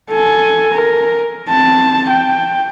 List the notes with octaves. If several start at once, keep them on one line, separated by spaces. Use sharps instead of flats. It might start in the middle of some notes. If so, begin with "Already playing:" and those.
A4 G#5
A#4
C4 A5
G5